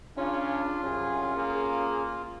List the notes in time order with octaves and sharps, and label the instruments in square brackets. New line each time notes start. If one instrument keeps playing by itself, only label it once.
[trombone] C#3 [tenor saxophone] C#4 [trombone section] D4 [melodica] F4
[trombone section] C2 F#2 [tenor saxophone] C#4 [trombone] G#4
[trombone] A#3 [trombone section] G#4